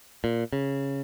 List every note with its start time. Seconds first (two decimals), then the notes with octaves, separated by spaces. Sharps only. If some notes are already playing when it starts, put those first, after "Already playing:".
0.24 A#2
0.53 C#3